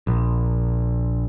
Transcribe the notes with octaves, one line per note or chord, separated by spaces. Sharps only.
A#1